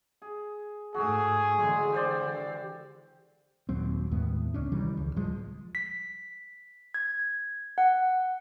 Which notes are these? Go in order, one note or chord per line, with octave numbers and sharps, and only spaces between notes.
G#4
G#2 A3 F#4 G#4
D3 E3 G#3
G4 C5 D5
D#1 D#2 F#3 C4
D#2 A2 G#3 B3
C#2 C#4 D4
C2 D#3 E3 G3
C#2
D1 F3 G3 G#3
B6
G#6
F#5